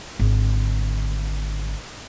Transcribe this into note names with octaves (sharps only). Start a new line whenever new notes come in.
G#1 D3